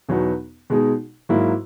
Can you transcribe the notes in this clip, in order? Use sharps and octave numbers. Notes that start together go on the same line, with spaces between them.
E2 B2 F#3 B3 D#4
B2 G#3 D#4 G#4
G#2 F#3 A#3 E4